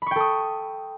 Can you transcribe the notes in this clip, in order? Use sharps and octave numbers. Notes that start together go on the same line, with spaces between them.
A4 G5 B5 C#6 D#6